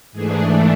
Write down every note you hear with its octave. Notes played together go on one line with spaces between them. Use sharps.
G#2 E3 A3 D4 G#4